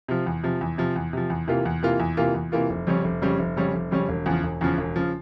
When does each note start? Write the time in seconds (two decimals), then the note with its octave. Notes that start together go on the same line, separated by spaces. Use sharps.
0.08 C3 F3
0.26 E2
0.43 C3 F3
0.61 E2
0.78 C3 F3
0.96 E2
1.13 C3 F3
1.30 E2
1.48 C3 E3 A#3 F4
1.65 E2
1.83 C3 E3 A#3 F4
2.00 E2
2.17 C3 E3 A#3 F4
2.34 E2
2.52 C3 E3 A#3 F4
2.70 F1
2.87 F2 C#3 G3 C#4
3.04 F1
3.22 F2 C#3 G3 C#4
3.39 F1
3.57 F2 C#3 G3 C#4
3.74 F1
3.91 F2 C#3 G3 C#4
4.09 E1
4.26 E2 C#3 F3
4.43 E1
4.61 E2 C#3 F3
4.78 E1
4.96 C#3 F3